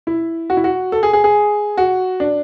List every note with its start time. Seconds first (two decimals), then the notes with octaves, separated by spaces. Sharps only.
0.07 E4
0.50 F#4
0.57 E4
0.64 F#4
0.92 A4
1.03 G#4
1.13 G#4
1.24 G#4
1.77 F#4
2.20 D4